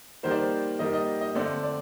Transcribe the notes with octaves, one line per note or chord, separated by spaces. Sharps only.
D#3 G3 A#3 C5
D5
C5
D#3 G3 A#3 D#5
D#5
D#5
D3 A3 C4 D5
D5